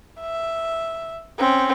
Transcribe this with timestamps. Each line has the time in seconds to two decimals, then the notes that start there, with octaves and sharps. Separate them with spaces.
0.20 E5
1.39 C4 C#4